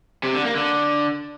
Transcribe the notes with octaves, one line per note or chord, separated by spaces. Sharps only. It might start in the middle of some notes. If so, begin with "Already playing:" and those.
C3
D3
A#3
D3